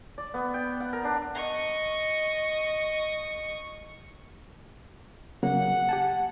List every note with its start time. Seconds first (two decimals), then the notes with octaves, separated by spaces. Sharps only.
0.18 D5
0.34 B3
0.54 G5
0.80 F#5
0.93 A#4
1.05 D4
1.35 D#5 C#6
5.43 C#3 F#3 A#3 F#5
5.89 G4 G#5 A5